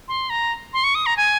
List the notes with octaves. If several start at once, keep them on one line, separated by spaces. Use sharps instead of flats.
C6
A#5
C6
C#6
D#6
A#5
G#5